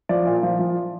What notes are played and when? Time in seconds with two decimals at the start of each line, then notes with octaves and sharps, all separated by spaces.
0.09 F3 D5
0.26 A#2
0.43 F3
0.59 F3